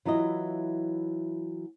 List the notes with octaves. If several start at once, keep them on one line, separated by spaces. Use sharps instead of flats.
E3 F#3 E4 F4 D#5